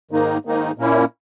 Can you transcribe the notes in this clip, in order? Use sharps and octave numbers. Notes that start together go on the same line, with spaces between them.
G#2 D#3 A#3 D#4
G#2 D#3 A#3 D#4
A#2 A#3 C#4 E4